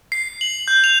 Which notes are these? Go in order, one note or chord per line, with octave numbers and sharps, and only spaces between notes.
C7
F#7
G6
F7